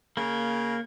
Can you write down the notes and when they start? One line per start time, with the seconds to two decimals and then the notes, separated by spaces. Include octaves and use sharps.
0.17 C#3 A#3 A#4